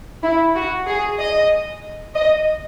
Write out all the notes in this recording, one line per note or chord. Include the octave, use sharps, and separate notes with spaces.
E4
F#4
G#4
D#5
D#5